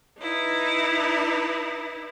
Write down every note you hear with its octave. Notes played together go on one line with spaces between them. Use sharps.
D#4 E4 B4